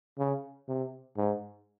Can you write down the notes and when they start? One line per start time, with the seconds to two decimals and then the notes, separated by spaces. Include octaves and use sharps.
0.18 C#3
0.68 C3
1.17 G#2